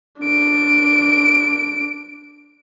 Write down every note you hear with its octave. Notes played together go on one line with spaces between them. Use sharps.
D4 D7